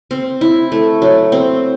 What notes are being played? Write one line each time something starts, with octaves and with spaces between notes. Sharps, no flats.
C4
E4
A3
F#3
C4